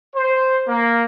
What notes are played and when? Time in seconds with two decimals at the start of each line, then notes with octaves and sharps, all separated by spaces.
0.15 C5
0.69 A#3